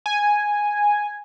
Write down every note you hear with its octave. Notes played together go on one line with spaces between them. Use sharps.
G#5